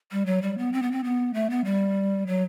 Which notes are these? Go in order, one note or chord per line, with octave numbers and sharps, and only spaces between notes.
G3
F#3
G3
B3
C4
B3
C4
B3
A3
B3
G3
F#3